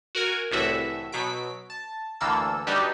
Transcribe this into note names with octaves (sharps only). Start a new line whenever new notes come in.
F#4 A#4 G#5
C2 A2 E3 F#4 E5
B2 F#3 B6 D7
A5
D2 E3 A#3 A4 E6
G3 D4 D#4 F#4 G4 B4